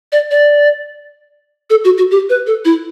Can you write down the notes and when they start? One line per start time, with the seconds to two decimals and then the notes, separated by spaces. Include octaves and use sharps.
0.12 D5
0.31 D5
1.70 A4
1.85 F#4
1.98 F#4
2.11 G4
2.30 B4
2.47 A4
2.65 E4